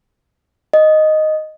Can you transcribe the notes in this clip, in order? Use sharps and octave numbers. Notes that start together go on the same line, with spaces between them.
D#5